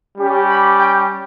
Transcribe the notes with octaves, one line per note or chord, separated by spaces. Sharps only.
G3 C#4 G4
B5
G5